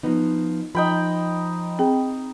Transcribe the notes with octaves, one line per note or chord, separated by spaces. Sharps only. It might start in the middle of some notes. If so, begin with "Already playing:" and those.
F3 B3 D#4
F3 D#4 G5 B5
C4 G#4 G5